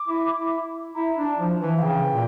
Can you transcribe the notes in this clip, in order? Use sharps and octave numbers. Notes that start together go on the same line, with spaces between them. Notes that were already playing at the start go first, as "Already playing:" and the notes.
Already playing: D6
E4
E4
E4 A#5
D4
A5
F3
E3
F5
C#3 G5
A#2